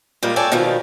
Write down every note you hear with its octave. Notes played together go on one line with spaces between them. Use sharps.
A#2 G3 G#3 A#3
A4 C#5 D5 G5 G#5
B2 D#3 F3 G3